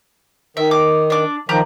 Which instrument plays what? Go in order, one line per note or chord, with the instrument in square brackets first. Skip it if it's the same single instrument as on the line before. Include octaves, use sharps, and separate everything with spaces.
[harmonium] D#3 [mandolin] E5
[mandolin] D6
D4 D6
[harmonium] D#3 F3 [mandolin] G4 A#5 F#6